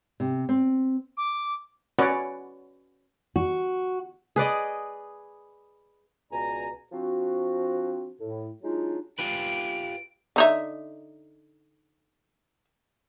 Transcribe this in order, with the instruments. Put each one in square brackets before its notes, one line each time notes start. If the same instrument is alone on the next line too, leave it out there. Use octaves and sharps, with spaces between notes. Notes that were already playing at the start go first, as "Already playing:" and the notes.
[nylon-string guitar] C3
C4
[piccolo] D6
[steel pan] C#4 F#4 B4 C#5 D5 F#5
[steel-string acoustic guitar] F#4
[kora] G#4 B4 D5 D#5
[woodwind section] C#2 B2 D5 G#5 A#5
F3 C4 D4 F#4
A2
F#3 G#3 D4 D#4 F4
[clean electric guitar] F4 G4 B4 [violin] D7
[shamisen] D3 D#4 E5